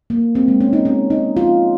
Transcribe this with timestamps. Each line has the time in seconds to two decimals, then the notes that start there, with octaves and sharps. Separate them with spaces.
0.10 A#3
0.35 C4
0.48 G#3
0.61 C#4
0.73 D#4
0.85 C#4
1.10 D#4
1.37 F4